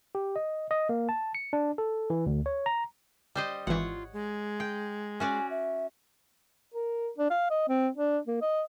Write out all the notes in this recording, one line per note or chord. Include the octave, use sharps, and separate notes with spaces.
G4
D#5
D#5
A#3
A5
C#7
D4
A4
E3
D2
C#5
A#5
G3 C5 D#5
G#1 E3 F4 C#5 F#5
G#3
G5
C#4 F#4 D5 G#5
E5
A#4
D4
F5
D#5
C4
D4
A#3
D#5